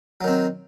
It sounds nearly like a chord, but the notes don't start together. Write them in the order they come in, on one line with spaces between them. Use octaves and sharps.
F#3 D#3 C4